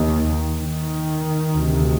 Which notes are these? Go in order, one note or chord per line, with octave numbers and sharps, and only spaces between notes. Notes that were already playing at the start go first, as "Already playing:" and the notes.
Already playing: D#2 D#3
D#3
D2 C3